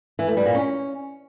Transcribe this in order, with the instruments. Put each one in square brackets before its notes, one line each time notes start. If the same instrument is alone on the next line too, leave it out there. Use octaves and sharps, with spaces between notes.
[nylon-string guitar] E3
A3
G3
A#2
C#4